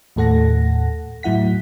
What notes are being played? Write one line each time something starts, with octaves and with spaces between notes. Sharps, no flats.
D#2 A2 A4 F#5 A#6
A2 F#3 E4 F#5 B6